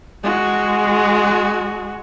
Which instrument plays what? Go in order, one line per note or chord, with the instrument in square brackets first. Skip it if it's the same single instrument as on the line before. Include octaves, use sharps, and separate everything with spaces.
[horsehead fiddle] G#3 F#4